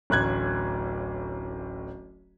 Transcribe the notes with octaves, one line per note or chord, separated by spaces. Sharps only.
D1 A1 F#6 G#6